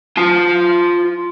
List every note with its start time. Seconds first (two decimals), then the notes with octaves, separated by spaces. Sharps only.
0.18 F4 A5